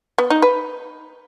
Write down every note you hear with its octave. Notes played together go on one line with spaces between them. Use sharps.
B3
D#4
B4